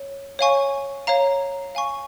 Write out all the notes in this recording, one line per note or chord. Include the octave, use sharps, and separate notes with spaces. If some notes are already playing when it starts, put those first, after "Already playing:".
Already playing: C#5
C#5 F5 G#5 C#6
C#5 F5 A#5
F5 G#5 C#6